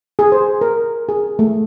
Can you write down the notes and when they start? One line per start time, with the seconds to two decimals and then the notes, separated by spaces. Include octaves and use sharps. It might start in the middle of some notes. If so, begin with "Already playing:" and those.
0.19 G#4
0.32 C5
0.61 A#4
1.09 G#4
1.39 A3